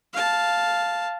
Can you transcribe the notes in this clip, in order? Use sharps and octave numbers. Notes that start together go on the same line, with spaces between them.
F5 A5